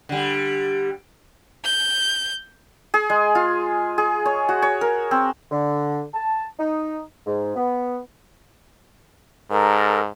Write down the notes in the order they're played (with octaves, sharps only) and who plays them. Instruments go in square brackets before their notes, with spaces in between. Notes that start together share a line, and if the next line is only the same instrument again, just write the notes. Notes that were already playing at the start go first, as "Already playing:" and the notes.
[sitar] D3 G3
[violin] G6
[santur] G#4
G#3
F4
G#4
C#5
F#4
C#5
A#4
C4
[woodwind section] D3
A5
D#4
G#2
B3
[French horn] G#2 [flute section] A4 A#4